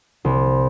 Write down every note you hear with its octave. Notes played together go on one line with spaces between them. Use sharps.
C2